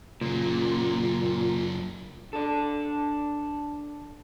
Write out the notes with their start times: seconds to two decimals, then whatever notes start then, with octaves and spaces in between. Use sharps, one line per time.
0.21 F#2 A#2 C#3
2.33 D4 A4 D5